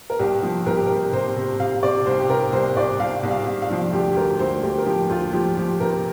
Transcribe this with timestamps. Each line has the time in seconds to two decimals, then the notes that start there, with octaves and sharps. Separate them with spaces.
0.10 A#4
0.19 C2 G4
0.43 F3
0.66 C2 A#4
0.76 G4
0.87 C3 A#4
1.13 C3 C5
1.37 C3
1.59 C3 F5
1.83 C3 D5
2.06 C2 C5
2.20 G4
2.30 C3 A#4
2.52 C2 C5
2.76 C2 D5
3.00 C2 F5
3.23 C2
3.30 F5
3.46 C3
3.62 F5
3.70 F3
3.93 D2 G4
4.13 G4
4.17 D2 A#4
4.39 D2 C5
4.63 D2 G4
4.78 A#4
4.86 F3 G4
5.10 D2 F4
5.33 F3 G4
5.57 F3 G4
5.80 C3 A#4